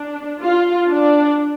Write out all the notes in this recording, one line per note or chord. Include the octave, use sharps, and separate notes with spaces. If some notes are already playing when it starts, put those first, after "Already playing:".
Already playing: D4
F4
D4